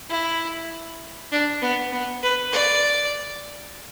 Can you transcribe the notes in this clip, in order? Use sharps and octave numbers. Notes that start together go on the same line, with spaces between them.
E4
D4
B3
B3
B4
D5